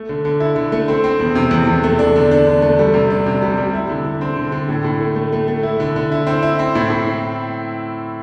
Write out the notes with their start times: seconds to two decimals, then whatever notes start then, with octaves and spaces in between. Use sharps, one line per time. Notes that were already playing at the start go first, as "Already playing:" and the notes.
Already playing: A3
0.09 D3
0.25 D3
0.40 E4
0.56 D3
0.72 A3
0.88 C4
1.04 C4
1.20 E2
1.35 C3
1.51 E2
1.67 E2
1.84 A3
1.99 D4
2.16 D3
2.31 D4
2.47 D3
2.62 A3
2.79 G3
2.94 C3
3.11 D4
3.26 C3
3.42 G3
3.58 G3
3.73 E4
3.89 D3
4.05 D3
4.21 C4
4.36 D3
4.52 D3
4.69 A2
4.84 A2
5.00 A3
5.16 A3
5.33 A3
5.48 A3
5.63 E4
5.80 D3
5.96 D3
6.12 E4
6.27 C4
6.43 E4
6.59 C4
6.75 A2
6.90 A2